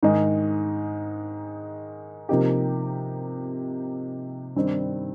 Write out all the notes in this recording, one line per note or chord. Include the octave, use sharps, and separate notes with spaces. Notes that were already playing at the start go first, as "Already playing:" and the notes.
G#2 D#3 G#3 D#4
C3 F3 A#3 D#4 G4
G2 D#3 G3 C4 D#4